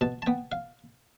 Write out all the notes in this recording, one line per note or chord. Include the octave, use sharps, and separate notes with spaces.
B2 A5
A5
B3 G5
F5